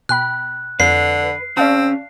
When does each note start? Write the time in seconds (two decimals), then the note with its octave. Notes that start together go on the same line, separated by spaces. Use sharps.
0.09 B2 G5 B5 F#6
0.80 F2 D3 B4 C7
1.57 C#3 C4 C#4 D5 F5 A5